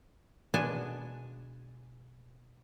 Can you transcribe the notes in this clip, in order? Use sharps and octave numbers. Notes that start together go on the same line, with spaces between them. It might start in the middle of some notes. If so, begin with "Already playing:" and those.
B2 G#3 B3 D4 G#5 A5